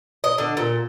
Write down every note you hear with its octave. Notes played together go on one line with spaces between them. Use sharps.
D#5
D3
A#2